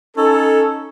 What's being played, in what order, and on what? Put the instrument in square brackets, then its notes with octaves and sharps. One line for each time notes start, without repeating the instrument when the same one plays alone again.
[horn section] C#4 D#4 A4